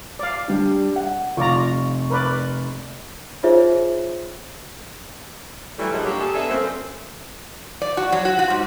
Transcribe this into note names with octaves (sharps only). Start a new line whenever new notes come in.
D5 F5
G3 D4
F#5
F1 F4 D5 A#5 C#6
A#4 B4 D5
D#4 F4 G#4 C5 C#5 E5
E3 F#3 G3 A3
A#2 F3 F#3 D4 D#4 G#4
G3 A#3 D4 F#4 G4
G#4 A4
A#3 B3 D4 G#4 A4 E5
F#2 A3 A#3 C4
D5
F#4
F#3
F#4
F#4
G#2